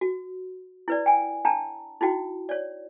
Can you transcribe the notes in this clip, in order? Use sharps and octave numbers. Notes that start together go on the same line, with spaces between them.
F#4
E4 B4 D5
G5 G#5
D4 G5 A5 A#5
D#4 E4 F#4 G5
C#5 D5